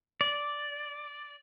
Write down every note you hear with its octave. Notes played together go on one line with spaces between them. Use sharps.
D5